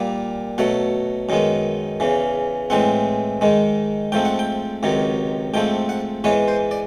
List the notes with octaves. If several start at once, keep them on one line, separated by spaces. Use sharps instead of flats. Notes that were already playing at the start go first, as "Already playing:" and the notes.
Already playing: A#2 G3 A#3
B2 F#3 A3 F#5
F#2 D#3 G#3 B3
E2 C#3 E3
A2 E3 G#3 C4 F#5
G#2 D#3 G#3
G#2 F3 A3 C4 G5
F#5
G5
C#2 C3 D#3 F#3
G#2 F3 A3 C4 G5
F#5
G#2 E3 G#3 B3 C#5
C5
D5